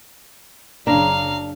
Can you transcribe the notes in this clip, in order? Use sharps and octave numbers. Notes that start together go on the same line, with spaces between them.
F#1 F#2 C#3 D4 F5 A#5